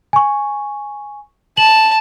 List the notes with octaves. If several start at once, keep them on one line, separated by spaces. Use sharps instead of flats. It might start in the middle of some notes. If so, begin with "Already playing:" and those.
G#5 C#6
A5 F#7